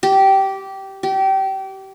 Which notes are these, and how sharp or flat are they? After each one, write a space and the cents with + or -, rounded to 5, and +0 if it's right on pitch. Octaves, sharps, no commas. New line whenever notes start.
G4 -15
G4 -25